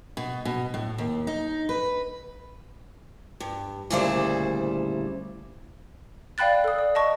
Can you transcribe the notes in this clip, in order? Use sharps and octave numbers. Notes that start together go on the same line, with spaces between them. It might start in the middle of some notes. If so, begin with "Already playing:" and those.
B2
B2
A2
D#2
D#4
B4
G2
D2 A#2 C#3 G3 E4 C5
D5 F5 G5 B5 F#6 A6
A4 D#6
D5
D#5 A5 C#6